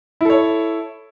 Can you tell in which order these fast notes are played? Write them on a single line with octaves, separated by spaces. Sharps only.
E4 A4 C#5